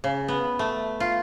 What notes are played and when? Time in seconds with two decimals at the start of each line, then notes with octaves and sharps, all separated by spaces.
0.04 C#3
0.28 B3
0.59 A3
1.00 F4